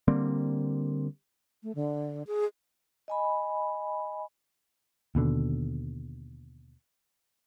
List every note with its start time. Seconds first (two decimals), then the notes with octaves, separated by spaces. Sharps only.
0.08 D3 G3 A#3 C4
1.63 A3
1.75 D3
2.27 G#4
3.08 D#5 G#5 B5
5.15 D#2 B2 D3